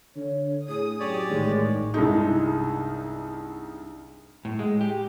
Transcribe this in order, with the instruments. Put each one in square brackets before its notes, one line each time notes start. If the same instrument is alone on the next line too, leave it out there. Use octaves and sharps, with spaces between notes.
[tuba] D3 [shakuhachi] C#5
[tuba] A2 [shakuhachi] G#4 [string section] D#6
[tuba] F#2 [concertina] G4 C#5 D5
[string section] A1 A2 G#3 [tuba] D#3
[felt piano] C2 G2 G#3 D#4
[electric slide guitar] A2
G#3
G4